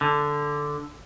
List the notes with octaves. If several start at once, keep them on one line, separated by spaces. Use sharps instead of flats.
D3